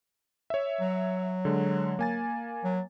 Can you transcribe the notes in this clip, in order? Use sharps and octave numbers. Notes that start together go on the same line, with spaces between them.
C#5 E5
F#3
D3 G#3
A#3 G#5 A6
F#3